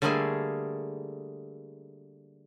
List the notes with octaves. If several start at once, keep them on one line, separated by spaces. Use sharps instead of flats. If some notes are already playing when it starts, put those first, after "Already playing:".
D3 G3 A3 A#3 G#4 F5